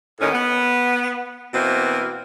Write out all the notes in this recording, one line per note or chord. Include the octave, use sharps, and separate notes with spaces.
D#2 A2 D#3 C#4
B3
B2 E3 A#3 C4 B4